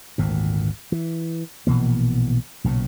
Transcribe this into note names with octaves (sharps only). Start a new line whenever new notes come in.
G#1 D2 A#2
E3
A#1 B2 E3 A#3
B1 A#2 C#3